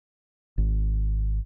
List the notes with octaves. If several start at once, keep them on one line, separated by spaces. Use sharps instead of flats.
G#1